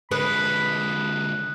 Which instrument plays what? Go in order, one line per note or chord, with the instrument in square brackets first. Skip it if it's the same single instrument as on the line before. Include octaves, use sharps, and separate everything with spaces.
[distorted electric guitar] D3 G#3 [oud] B4 [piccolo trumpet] B5 [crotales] D#6 F#6 C#7